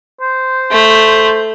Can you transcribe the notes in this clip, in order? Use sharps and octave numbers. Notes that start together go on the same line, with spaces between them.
C5
A3